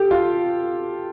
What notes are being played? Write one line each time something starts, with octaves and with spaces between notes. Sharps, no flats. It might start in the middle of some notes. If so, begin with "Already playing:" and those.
Already playing: G4 A4
F4